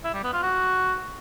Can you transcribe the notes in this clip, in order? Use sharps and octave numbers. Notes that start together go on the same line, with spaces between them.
E4
G3
B3
F4
F#4